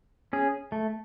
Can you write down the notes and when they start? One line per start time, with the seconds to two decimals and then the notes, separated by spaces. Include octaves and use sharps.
0.33 C#4 G#4
0.72 A3